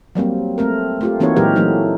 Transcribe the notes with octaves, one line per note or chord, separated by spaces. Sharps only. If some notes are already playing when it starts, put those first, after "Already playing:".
F#3 G3 A#3 C4
A3 C4 A#4
A3 F4 G4
E3 A#3 C4 D#4 F#4 C#5
A#2 E3 F#3 G#3 G4 A#4
E3 F#3 A3 D#4